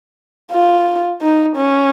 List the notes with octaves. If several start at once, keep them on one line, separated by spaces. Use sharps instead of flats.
F4
D#4
C#4